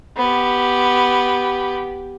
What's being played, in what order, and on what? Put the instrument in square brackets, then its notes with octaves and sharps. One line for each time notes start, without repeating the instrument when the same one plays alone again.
[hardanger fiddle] B3 G4